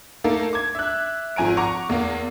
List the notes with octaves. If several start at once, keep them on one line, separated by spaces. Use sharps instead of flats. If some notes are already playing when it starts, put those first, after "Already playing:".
A3 A#3 D#4 A4 A#4
D6 G#6
E5 F#6
G#1 F3 G#5 A#5 D7
F#5 A#5 C#6 D6
E2 A#3